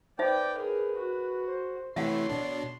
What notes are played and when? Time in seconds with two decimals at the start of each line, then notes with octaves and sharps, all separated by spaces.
0.19 D#4 B4 C5 D5 E5 G5
0.56 G#4 A#4 B4
0.96 F#4
1.48 C5
1.96 C3 E3 A3 C#5 E5 F#5 C6
2.29 B2 D4